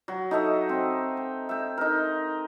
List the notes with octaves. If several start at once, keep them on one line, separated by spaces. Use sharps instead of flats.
F#3
D#4 A4 D#5 E5
C4
G5
E5 G5
D#4 A#4